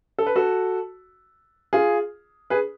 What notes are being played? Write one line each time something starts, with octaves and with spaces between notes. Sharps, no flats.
A4
B4
F#4 A4
F4 G#4
G#4 B4